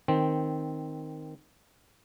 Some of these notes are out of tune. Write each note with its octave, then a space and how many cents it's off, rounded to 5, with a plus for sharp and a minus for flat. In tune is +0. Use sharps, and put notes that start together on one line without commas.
D#3 +0 C4 +0